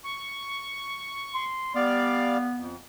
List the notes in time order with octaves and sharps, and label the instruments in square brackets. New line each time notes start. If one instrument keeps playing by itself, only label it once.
[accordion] C#6
[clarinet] C6
[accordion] G3 D5 F5 [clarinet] B3
[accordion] F2